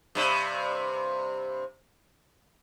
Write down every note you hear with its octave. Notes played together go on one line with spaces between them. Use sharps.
G2 C3